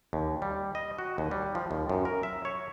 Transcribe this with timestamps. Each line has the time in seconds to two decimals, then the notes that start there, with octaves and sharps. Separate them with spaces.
0.13 D#2
0.42 G3
0.75 D#5
0.99 F#4
1.18 D#2
1.31 G3
1.55 F3
1.71 D#2
1.89 F#2
2.05 A#4
2.23 E5
2.45 C#5